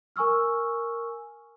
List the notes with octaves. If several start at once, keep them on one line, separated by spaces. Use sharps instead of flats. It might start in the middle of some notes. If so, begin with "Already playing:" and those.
A#4 G#5 C#6 E6 F6